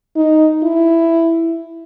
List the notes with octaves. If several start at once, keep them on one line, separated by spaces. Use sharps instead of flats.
D#4
E4